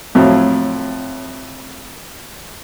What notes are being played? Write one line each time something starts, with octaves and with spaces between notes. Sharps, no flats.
F2 A2 F#3